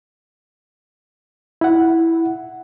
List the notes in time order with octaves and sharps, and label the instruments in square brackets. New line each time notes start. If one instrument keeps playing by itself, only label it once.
[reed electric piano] E4 F#5